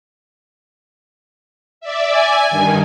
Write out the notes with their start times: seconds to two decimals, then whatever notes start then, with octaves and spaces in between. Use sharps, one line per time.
1.81 D5 E5
2.14 G#5
2.50 G2 D#3